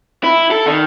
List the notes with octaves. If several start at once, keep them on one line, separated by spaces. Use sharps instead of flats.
E4
A4
D#3